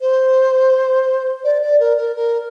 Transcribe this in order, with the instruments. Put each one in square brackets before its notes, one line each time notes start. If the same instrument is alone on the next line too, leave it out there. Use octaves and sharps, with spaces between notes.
[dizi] C5
D5
D5
A#4
A#4
A#4